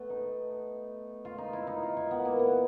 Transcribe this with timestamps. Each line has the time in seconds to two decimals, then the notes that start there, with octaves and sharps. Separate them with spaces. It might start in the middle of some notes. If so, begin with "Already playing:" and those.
Already playing: A3 B3
0.10 D#4
1.25 F4
1.38 D#4
1.53 E4
1.67 D#4
1.83 F4
1.97 E4
2.11 B3
2.25 A#3
2.39 B3